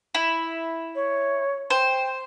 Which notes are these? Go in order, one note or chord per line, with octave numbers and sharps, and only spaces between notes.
E4
C#5
C5 G5